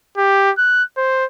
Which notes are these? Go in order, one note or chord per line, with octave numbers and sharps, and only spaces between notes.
G4
F#6
C5